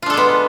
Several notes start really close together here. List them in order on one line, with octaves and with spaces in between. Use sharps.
F4 D4 A4 G#3 B3